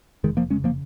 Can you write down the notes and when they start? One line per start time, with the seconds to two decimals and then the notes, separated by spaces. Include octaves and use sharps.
0.24 F1 D#3 G#3
0.37 F3 A#3
0.50 C#3 G#3 C#4
0.64 F3 A#3